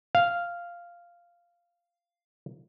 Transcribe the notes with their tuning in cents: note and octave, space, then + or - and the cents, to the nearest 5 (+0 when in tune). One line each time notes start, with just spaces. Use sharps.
F5 -5